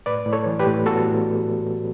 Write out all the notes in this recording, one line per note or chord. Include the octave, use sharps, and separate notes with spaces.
A2 B4 D5
A2
A4 C#5
E3
G4 B4
A2
B3 F#4 A4
A2